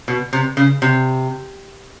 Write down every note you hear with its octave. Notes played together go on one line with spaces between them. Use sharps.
B2
C3
C#3
C3